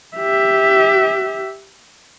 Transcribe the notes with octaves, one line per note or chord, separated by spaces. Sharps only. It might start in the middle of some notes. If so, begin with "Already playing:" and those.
G4 E5